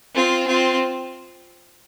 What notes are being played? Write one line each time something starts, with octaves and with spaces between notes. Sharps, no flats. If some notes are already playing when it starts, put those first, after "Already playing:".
C4 F4
C4 F4